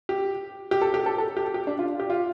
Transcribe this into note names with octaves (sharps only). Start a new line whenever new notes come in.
G4
G4
A4
G4
A4
A4
G4
G4
D4
F4
G4
F4